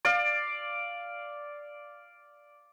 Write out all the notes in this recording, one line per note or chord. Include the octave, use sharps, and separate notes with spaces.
D5 F5